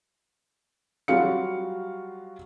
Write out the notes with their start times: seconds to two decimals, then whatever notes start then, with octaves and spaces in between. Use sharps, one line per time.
1.08 F#3 G3 F4 F#4 F5 C#7